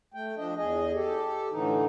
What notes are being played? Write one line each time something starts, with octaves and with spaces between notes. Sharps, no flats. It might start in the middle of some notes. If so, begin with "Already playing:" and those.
A3 G5
F3 D4 D#5
E2 G#4 D#5
G4 A4
A2 D3 E3 D#4